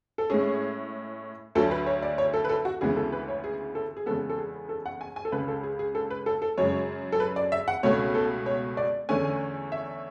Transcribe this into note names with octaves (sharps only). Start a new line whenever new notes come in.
A4
A2 G#3 C#4 G#4
D2 D3 F#3 A4
B4
C#5
D5
C#5
A4
B4
A4
F#4
D2 C#3 E3 G#3 B3 G#4
A4
B4
C#5
G#4
A4
G#4
E2 C#3 G#3 B3 A4
A4
G#4
A4
F#5
G#5
G#5
A4
C#2 C#3 G#3 B4
A4
G#4
G#4
A4
B4
A4
A4
F#2 C#3 G#3 C#5
A4
B4
D5
E5
F#5
C#2 B2 A3 C#4 C#5
A4
C#5
D5
E2 D3 A3 C#4 G#5
E5